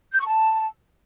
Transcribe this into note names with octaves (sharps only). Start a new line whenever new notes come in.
G6
C#6
A5